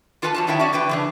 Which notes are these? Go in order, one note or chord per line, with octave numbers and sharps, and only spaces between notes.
E3 F4 A4 B4 G#5 A5
F2 F#3 A5
D#3 F#3 E4 E5 G5
C#4 F#4 D5
D3 E3 B4 G5
C#3 E3 D4